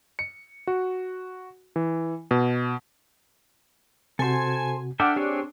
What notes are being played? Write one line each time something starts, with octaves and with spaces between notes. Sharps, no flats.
C#7
F#4
E3
B2
C3 F#4 A4 C5 G#5
D4 A4 E5 F#5 G5 D6 F6
C4 G4 G#4 C#5